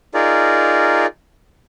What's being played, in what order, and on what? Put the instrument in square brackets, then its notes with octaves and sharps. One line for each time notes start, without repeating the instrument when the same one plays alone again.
[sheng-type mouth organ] D#4 F4 G#4 A#4 D5